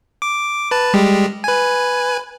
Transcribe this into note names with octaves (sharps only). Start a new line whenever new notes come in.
D6
B4 A5
G3 G#3 G4
B4 G#5